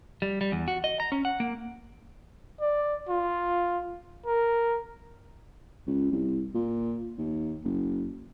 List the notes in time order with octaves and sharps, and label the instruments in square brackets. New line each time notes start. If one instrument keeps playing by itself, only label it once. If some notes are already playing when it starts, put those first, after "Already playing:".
[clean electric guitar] G3
G3
E2
F#4
D#5
A#5
C#4
F#5
A#3
[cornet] D5
F4
A#4
[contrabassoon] C#2
C2
A#2
D#2
F#1